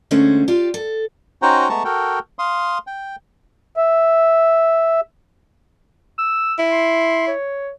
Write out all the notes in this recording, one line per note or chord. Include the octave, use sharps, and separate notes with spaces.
D2 D3 G#3 A3 C#4 C5
F4 G4 D5
A4
C#4 D#4 F#4 C5 G5 A#5
G#3 A3 B3 A5 A#5 C#6
F#4 A4 A#4 G5
F5 C6 D#6
G5
E5
E6
E4
C6
C#5